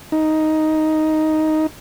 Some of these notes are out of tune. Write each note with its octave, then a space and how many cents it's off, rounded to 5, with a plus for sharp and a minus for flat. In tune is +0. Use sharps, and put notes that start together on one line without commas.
D#4 +5